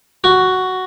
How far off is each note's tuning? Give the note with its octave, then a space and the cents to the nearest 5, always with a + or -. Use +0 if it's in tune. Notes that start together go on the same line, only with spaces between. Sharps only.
F#4 +5